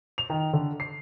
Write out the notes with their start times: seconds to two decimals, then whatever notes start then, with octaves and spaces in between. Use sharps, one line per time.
0.18 F7
0.30 D#3
0.53 D3
0.80 C7